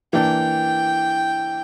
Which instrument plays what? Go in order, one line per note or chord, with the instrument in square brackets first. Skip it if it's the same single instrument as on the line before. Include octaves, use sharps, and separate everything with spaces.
[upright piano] E3 A#3 D4 [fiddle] G5